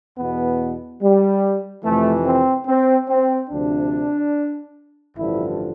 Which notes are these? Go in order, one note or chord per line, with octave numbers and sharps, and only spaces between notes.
E2 B2 B3
G3
F2 C3 E3 A3
C4
C4
C4
D2 C3 F3 D4
A1 G2 D3 F3 E4